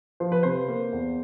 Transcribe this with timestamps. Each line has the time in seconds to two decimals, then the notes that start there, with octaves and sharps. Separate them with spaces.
0.20 F3 C5
0.32 B4
0.43 C3 C5
0.68 A#3
0.93 E2